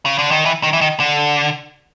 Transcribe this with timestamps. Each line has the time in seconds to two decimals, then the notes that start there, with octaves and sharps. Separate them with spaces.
0.06 C#3
0.18 D3
0.31 D#3
0.45 E3
0.63 D#3
0.73 E3
0.81 D#3
1.00 D3